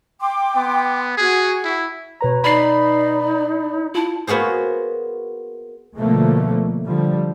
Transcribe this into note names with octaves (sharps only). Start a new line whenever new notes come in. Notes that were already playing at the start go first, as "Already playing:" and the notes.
G5 C6 D6
B3
F#4 G#4
E4
B2 B4 C#5 A#5
D#4 D5 B5 C7
E4 F4 A5
A#3 B3 F#4 G#4 C5
B2 D3 F3 A3 A#3
D3 F3 G3